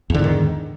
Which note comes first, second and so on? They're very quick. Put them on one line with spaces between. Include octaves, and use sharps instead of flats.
E2 D3 G#2 D#3